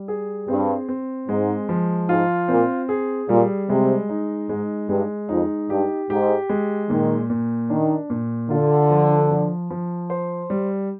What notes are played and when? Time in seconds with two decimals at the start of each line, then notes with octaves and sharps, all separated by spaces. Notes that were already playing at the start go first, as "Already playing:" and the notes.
Already playing: G3
0.08 G#4
0.48 G2 C4
0.89 C4
1.28 G#2 G#3
1.69 F3
2.09 G#2 F4
2.48 A#2 C4
2.89 G#4
3.29 A#2 G3
3.69 C3 G#3
4.09 D#4
4.49 G#2 G#3
4.89 G2 G#3
5.29 F2 D#4
5.69 G2 G4
6.10 G#2 G4
6.50 G#3
6.90 A#2 D#3
7.30 A#2
7.70 D#3 D4
8.10 A#2
8.50 D3 F4
8.90 F3
9.31 F3
9.70 F3
10.10 C5
10.50 G3